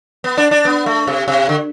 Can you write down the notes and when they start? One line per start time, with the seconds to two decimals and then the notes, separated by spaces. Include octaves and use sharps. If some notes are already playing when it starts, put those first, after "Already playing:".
0.24 B3
0.37 D4
0.51 D4
0.65 B3
0.86 A3
1.07 C3
1.28 C3
1.49 D3